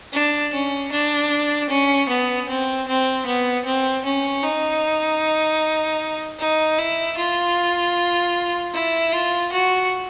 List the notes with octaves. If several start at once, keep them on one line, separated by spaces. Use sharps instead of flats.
D4
C#4
D4
C#4
B3
C4
C4
B3
C4
C#4
D#4
D#4
E4
F4
E4
F4
F#4